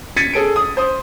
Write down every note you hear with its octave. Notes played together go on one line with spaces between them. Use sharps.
G#6 A6 B6 C#7 D#7
G#4 A4 D7
D#6
C5 D#6